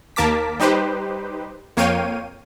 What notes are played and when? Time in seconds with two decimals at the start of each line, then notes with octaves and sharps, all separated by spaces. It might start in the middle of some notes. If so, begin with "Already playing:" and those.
0.16 D#2 A#3 A#4 A5 D6 B6
0.60 G3 D#4 G4 B4 C5
1.77 F2 A#3 C#5 F5 G5 D#7